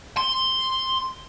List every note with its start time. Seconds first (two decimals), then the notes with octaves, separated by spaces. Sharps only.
0.17 C6